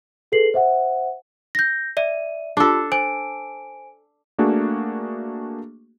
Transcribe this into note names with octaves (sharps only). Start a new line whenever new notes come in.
G#4 A4 B4 C7 F#7
C5 E5 F#5
G6 A#6
D5 E5 D#7
D4 F4 G4 A4
C5 G#5 D7
A3 A#3 D4 F#4 G#4